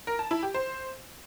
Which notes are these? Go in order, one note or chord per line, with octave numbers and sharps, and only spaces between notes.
A#4
A5
E4
G4
C5